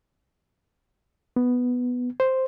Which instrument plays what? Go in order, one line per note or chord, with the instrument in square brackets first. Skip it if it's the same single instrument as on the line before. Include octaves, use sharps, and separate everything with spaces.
[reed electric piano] B3
C5